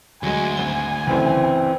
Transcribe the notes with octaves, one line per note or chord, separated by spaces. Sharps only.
D2 F#3 G#3 G#5
G#1 G#5 G7
G1 C#2 E3 C4